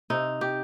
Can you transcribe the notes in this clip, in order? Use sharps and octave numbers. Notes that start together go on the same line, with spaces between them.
C3 D#4
G4